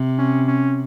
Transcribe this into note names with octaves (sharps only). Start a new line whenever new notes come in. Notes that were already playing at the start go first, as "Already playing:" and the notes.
Already playing: C3
C#4
C#4